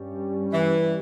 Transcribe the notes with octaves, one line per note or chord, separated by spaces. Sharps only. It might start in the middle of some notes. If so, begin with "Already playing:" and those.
Already playing: G2 G3 C#4
E3